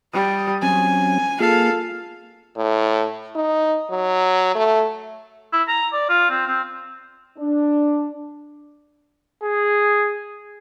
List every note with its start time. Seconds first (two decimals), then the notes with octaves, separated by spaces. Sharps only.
0.13 G3 D#6
0.62 F#3 C4 C#4 G#5
1.40 A#3 F4 G#4 A4 F5
2.57 A2
3.35 D#4
3.91 F#3
4.55 A3
5.53 E4
5.68 A#5
5.92 D5
6.09 F4
6.30 C4
6.47 C4
7.38 D4
9.42 G#4